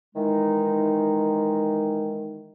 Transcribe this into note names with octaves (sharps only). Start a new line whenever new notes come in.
D#3 E3 G#3 D#4